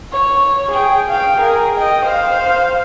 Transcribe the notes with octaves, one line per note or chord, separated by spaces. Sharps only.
C#5
G#4 G5
F5 G5
G#4 A#4
D#5 G5
C5 F5